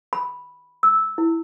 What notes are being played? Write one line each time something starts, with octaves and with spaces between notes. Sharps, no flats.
B5
E6
E4